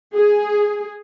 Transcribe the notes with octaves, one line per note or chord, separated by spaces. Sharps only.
G#4